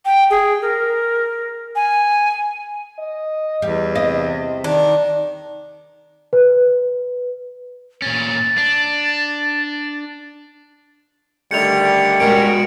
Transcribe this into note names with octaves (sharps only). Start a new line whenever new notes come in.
G5
G#4
A#4
G#5
D#5
E2 G3
C3 D#5
D#3 D4
B4
A#2 C#4 A6
D4
D3 D#3 G3 A3 C#7 F7
B2 G#3 C#4 D#4 F#4 A#4 D7